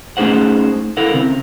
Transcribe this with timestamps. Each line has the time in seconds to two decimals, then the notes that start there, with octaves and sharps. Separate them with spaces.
0.17 A3 C#4 D#4 G#4 C5 F#5
0.97 E4 A4 A#4 F5 F#5
1.14 C#3 C4